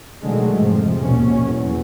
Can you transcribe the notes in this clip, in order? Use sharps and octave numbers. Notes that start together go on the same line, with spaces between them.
B2 D3 D#3 F#3 G#3 A3
F2 G#2 C3 F3
A#1 D#2 B2 C#4
E2 F#3